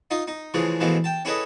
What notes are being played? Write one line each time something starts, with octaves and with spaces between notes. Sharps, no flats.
D#4 F4 D#5
D#4
C#3 E3 F3 G#3 A3
B2 E3 F3 G#3 A3
G5 A5
C#4 E4 G#4 A4 B4 D#5